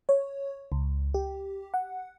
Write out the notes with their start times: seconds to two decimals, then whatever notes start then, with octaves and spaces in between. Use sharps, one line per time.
0.09 C#5
0.72 C#2
1.14 G4
1.74 F#5